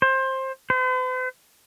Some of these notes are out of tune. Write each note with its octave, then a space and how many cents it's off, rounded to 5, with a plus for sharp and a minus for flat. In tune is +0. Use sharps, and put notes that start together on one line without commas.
C5 +20
C5 -45